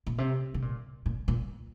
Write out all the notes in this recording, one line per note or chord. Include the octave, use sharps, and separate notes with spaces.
A#2
C3
C3
A#2
A#2
A#2